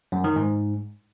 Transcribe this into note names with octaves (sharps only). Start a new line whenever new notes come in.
F#2
D#3
G#2